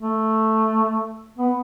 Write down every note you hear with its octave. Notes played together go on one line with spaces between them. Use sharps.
A3
B3